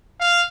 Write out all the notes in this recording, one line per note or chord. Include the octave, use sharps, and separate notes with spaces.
F5